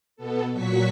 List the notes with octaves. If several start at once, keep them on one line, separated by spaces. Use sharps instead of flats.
B2 B3 A4
A#2 F#3 F#4 C#6 B6